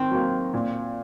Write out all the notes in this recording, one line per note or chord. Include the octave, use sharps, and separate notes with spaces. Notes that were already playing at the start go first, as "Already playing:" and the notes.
Already playing: D#3 C4
F#3 A#3
A#2